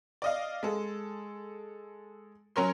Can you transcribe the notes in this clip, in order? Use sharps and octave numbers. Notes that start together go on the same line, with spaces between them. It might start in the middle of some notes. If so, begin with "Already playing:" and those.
D5 D#5 F5
G#3 A4
F#3 C#4 A#4 C#5 C6